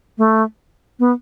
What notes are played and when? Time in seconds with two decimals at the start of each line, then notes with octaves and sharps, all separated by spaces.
0.18 A3
0.99 B3